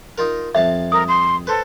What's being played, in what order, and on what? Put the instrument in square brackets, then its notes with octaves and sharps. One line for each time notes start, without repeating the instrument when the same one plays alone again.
[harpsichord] D#4 F4 A#4
[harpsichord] F2 F5 A5 [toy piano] E5
[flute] A#4 [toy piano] D#6
[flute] C6
[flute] A4 [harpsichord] B4 C5